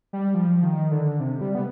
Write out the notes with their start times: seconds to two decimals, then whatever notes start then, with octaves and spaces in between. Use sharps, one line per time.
0.13 G3
0.34 F3
0.63 D#3
0.91 D3
1.20 C3
1.41 G3
1.55 B3